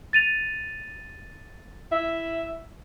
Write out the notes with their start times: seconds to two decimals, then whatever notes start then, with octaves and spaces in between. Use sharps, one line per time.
0.13 A6 D#7 F7
1.91 E4 E5